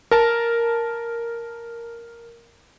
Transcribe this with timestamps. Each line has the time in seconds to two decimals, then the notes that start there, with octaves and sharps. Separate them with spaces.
0.11 A#4 A5